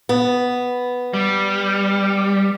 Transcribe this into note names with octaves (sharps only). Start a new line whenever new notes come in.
B3
G3